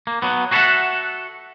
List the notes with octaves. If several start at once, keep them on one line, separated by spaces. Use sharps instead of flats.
A#3
F#3 B3
F#4 G#4 A4 B4 E5 F#5